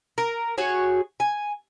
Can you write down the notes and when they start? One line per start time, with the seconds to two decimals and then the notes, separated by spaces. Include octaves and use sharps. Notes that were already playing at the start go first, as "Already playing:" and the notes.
0.18 A#4
0.58 F#4 G#4 C#5
1.20 G#5